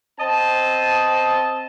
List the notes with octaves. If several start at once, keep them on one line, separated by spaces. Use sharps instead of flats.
C4 D#5 A5